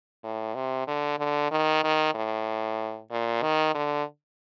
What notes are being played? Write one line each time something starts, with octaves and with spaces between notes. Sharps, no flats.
A2
C3
D3
D3
D#3
D#3
A2
A#2
D#3
D3